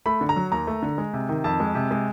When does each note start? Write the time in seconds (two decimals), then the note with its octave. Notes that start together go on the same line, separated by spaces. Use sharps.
0.06 A3 B5
0.21 D3
0.29 A#5
0.36 F#3
0.52 D#2 A#5
0.67 A3
0.83 D3
0.98 G#3
1.14 C3
1.29 D#3
1.44 F2 A5
1.60 G#3
1.75 C3
1.91 G#3